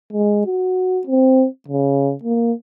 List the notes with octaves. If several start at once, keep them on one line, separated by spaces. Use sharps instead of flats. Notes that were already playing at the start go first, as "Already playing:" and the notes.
G#3
F#4
C4
C#3
A#3